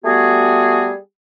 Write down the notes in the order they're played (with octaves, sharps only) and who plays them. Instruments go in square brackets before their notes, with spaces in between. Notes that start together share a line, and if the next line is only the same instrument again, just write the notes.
[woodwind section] G3 A3 B3 F#4 G#4